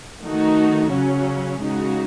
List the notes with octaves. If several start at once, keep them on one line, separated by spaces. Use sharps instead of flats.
D#3 A3 D#4 F#4
C#3 F#3 C#4
C#3 G#3 D#4 F#4